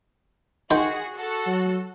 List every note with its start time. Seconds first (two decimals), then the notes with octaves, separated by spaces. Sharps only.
0.71 D#3 F#4 G#4 G5 C6
1.15 F#4 A4
1.46 F#3